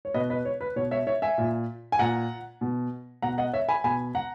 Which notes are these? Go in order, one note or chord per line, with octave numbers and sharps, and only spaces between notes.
C#5
B2 B4 D#5
B4 D#5
C#5
B4
B2 C#5
C#5 E5
C#5 E5
E5 G#5
A#2
G#5
A#2 F#5 A#5
B2
B2 F#5 A#5
D#5 F#5
C#5 E5
G#5 B5
B2 G#5 B5
F#5 A#5